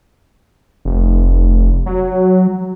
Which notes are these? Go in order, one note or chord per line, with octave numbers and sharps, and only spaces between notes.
F1
F#3